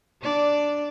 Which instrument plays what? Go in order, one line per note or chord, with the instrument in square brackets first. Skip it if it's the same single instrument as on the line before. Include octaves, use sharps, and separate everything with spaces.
[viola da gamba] D4 D5